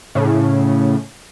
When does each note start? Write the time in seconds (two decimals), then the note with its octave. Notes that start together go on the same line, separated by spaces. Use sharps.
0.15 A2 C#3